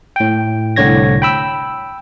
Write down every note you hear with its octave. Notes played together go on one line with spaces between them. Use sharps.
A2 G5
C2 A2 D3 C#5 G#6 A#6
G5 B5 E6